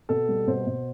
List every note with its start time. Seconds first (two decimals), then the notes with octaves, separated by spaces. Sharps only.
0.09 B2 A4
0.29 G3
0.47 B2 C5
0.67 B2